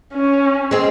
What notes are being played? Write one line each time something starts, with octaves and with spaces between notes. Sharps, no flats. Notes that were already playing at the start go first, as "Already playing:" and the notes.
C#4
G#3 C4